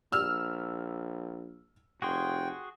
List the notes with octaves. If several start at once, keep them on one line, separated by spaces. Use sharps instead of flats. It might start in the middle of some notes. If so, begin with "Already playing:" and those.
A#1 E6 F6
F1 F#4 G#4 G5 C6